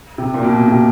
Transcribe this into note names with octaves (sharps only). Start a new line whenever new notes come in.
C3
A#2
B2
C3